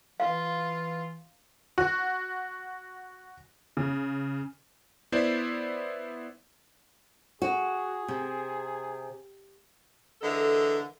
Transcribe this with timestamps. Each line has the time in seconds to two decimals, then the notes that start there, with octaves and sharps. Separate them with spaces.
0.20 E3 F4 F5
1.78 F#4
3.77 C#3
5.12 B3 E4 C5 D5 E5
7.42 F#4 G#4
8.08 C3
10.22 D3 E3 G#3 A4 A#4